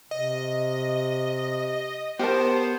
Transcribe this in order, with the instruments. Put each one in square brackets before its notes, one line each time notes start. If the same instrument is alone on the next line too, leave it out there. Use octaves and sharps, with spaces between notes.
[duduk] C3 [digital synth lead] D#5
[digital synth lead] B3 [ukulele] G4 A#4 A5 [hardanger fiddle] C5